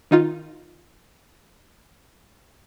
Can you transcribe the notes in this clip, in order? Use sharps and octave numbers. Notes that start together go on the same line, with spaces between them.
D#3 D#4 F4